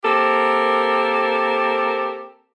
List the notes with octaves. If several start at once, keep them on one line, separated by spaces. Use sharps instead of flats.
A#3 C4 G4 A4 A#4